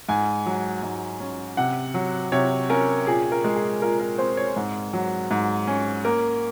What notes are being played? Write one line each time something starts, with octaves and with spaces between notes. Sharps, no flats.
G#2 G#5
F#3
G#2
C#4
C3 F#5
F#3
C3 C#5
C#4 A#4
A#2 G#4
A#4
G#3
G#4
A#2 A#4
A#4
C4 C5
C#5
G#2
F#3
G#2
C#4
A#3 A#4